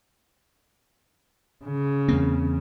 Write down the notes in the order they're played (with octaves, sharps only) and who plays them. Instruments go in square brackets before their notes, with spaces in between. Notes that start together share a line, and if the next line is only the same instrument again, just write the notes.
[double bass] C#3
[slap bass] E2 A#3 C4